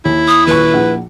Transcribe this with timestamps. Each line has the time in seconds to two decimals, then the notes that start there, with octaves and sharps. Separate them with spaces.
0.05 D#2 E4
0.28 D#6
0.47 D#1 B4 C#6
0.74 A#1 F#5